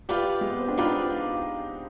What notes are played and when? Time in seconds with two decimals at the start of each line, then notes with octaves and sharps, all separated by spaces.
0.09 F4 G4 B4 D5 G5
0.41 G#3
0.51 B3
0.60 C4
0.69 D4
0.77 D#4 F4 B4 D5 G5